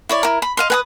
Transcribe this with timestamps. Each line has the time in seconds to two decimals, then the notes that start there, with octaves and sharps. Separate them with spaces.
0.09 E4 C#5 D5
0.23 E4 A#4
0.42 B5
0.57 D#5 F5 C6
0.70 B4 G#5 D#6